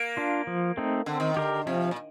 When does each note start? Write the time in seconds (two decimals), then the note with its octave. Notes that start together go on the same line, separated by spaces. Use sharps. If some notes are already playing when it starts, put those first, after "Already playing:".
Already playing: A#3
0.17 D4 F4
0.47 F3
0.77 A3 C4 D#4
1.06 D3 C4
1.20 D#3
1.34 D3 G4 A#4
1.66 C3 F3
1.91 A#2